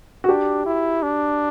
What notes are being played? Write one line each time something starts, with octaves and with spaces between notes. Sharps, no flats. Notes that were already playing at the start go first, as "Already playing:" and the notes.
F#4
D4 G4
E4
D4